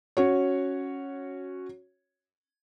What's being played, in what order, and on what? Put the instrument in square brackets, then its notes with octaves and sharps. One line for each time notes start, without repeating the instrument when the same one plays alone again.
[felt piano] C#4 F#4 C#5